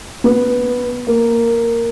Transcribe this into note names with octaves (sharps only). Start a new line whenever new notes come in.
B3
A#3